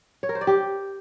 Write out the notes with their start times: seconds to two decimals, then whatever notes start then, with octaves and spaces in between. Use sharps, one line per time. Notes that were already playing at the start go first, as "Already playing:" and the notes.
0.23 C#5
0.29 A#4
0.35 C5
0.41 D5
0.47 G4